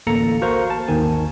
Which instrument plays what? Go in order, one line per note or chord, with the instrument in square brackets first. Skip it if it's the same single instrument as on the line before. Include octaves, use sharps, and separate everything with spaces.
[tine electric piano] A1 D2 A#3 A4 A#5 C#7
F#4 A#4 C5 F5 A#5 C#6
A5
G#1 D#2 D#3 G#5